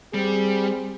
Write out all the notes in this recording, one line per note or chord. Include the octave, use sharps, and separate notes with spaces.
G3 C4 G#4